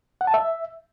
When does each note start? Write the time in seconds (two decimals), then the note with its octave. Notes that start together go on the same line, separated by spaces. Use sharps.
0.21 F#5
0.27 A5
0.34 E5